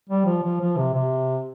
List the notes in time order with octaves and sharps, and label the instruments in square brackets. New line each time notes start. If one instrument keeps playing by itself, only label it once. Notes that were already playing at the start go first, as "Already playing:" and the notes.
[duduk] G3
F3
F3
F3
C3
C3